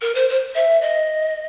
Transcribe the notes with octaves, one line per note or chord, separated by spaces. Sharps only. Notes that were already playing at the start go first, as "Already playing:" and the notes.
A#4
C5
C5
E5
D#5